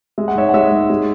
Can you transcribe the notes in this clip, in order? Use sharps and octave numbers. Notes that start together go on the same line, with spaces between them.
G#3 E5
F#5
G#2 C#5 E5
F#5
G#3 C#5 E5
G#2
G#3